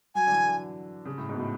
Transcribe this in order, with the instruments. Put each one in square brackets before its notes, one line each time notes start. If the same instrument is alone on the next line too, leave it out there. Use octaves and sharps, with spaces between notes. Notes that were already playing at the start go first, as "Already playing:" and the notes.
[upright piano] F#3 [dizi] G#5
[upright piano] D3
E3
D3
C#3
A2
G#2
B2
A2